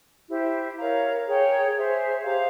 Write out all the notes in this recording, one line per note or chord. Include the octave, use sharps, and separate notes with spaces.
E4 G4 C5 E5
A#4 C#5 F5 A#5
G#4 C#5 G5 A#5
G#4 C5 E5 G#5
G4 C5 F5 A#5